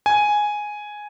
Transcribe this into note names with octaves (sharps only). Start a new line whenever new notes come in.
G#5